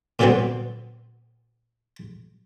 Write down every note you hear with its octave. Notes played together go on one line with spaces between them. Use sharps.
A#2 D3 F#3 G3 B3 C4